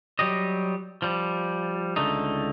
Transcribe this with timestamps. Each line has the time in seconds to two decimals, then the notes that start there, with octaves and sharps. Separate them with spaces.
0.19 F#3 G3 G4 D#5
1.02 F3 G3
1.96 C#2 D3 A3 D#4